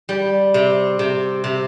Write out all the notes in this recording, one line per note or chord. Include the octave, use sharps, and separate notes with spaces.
G3
C3
C3
C3